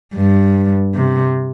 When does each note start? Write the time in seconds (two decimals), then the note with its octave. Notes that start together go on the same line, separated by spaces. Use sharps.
0.15 G2
0.95 C3